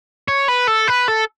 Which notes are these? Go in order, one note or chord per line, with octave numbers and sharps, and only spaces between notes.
C#5
B4
A4
B4
A4